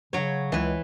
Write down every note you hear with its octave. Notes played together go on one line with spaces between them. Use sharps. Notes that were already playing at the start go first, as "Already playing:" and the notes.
C#3 F#3 C#5
C#2 E3 B4